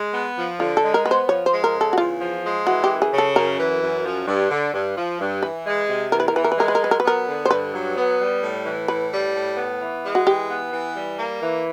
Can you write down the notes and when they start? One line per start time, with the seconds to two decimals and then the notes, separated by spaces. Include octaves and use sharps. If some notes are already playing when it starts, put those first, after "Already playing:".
Already playing: G#3
0.13 B3
0.37 F3
0.60 D3 F4
0.77 A4
0.83 G#3
0.94 A#4
1.05 B3 B4
1.11 C5
1.28 F3 C#5
1.46 C5
1.52 G#3
1.64 A#4
1.74 C#3
1.81 A4
1.93 F#4
1.98 E2 F4
2.21 F3
2.44 G#3
2.66 E3 F#4
2.84 G4
2.90 F#2
3.02 G#4
3.12 C#3
3.18 A4
3.36 F#2 A#4
3.59 E3
3.82 F#2
4.05 F3
4.27 G2
4.51 D3
4.73 G2
4.97 F3
5.20 G2
5.43 E3 B4
5.66 G#3
5.89 C3
6.12 E2 A#4
6.20 B4
6.28 A#4
6.35 E3 B4
6.44 A#4
6.52 B4
6.58 G#3 A#4
6.68 B4
6.75 A#4
6.81 F#3 B4
6.91 A#4
7.00 B4
7.04 B3 A#4
7.28 D3
7.45 C5
7.51 G2 B4
7.73 F#3
7.96 B3
8.19 G3
8.43 A2
8.65 E3
8.88 A2 B4
9.11 G3
9.35 A2
9.57 B3
9.81 E3
10.04 G#3
10.15 F#4
10.27 E3 G4
10.50 B3
10.73 E3
10.95 G3
11.19 A#3
11.42 E3